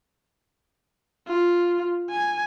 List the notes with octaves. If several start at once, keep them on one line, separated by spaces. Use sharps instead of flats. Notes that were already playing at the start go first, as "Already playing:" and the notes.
F4
G#5